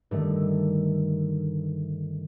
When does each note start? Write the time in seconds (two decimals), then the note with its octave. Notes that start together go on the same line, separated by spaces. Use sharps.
0.11 G2 D3 D#3 A3